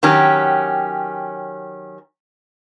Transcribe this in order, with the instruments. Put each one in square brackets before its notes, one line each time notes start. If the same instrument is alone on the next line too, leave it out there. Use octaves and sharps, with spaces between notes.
[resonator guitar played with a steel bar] D#3 F#3 C#4 G4